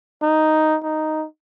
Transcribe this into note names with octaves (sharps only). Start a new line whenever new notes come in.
D#4
D#4